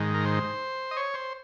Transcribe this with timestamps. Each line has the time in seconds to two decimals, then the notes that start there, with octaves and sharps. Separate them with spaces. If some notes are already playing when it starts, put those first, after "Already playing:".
Already playing: G#2 D#3
0.14 A#4
0.25 C5
0.91 D#5
0.97 C#5
1.14 C5